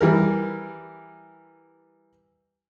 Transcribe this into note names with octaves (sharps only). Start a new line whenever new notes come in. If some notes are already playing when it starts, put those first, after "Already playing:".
E3 G3 A#4